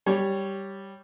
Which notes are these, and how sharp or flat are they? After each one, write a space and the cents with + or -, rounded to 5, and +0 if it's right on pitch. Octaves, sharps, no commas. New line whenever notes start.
G3 +0 C#5 +0